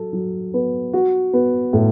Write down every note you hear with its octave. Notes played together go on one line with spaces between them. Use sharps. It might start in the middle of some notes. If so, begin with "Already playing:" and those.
Already playing: F#3 A4
F#3
B3
F#4
B3
A2